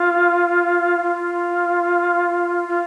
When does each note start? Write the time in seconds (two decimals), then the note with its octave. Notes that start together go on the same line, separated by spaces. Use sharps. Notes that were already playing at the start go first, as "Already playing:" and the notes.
Already playing: F4
1.03 F4
2.68 F4